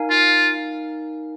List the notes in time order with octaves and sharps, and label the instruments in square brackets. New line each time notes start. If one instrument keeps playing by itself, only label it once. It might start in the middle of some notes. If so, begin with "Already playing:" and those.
Already playing: [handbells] D#4 A#4 F5 G#5
[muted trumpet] F4